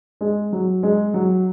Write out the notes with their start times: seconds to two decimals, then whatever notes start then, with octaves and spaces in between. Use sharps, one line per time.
0.21 G#3
0.53 F#3
0.83 G#3
1.14 F#3